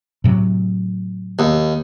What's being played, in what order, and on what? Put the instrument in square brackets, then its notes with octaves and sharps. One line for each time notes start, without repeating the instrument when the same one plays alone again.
[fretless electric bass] A2 C3 F#3
[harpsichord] D#2